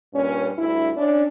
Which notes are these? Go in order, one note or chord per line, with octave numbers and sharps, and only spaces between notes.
G2 A#2 C#4
D2 G2 E4
C#4 D4